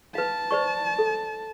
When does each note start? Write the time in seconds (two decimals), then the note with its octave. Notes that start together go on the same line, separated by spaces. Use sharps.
0.15 B4 F5 A5
0.51 C5 D5 C#6
0.99 A4